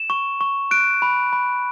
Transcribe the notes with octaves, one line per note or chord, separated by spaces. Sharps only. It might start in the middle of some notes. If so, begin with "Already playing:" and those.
Already playing: E7
C#6
C#6
F#6 D7
B5
B5